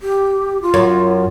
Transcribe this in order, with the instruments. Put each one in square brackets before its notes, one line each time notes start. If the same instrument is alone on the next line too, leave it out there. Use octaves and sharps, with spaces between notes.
[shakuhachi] G4
F4
[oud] F#2